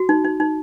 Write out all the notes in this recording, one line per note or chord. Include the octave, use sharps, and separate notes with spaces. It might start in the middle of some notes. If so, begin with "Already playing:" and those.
Already playing: F#4
D#4
D#4
D#4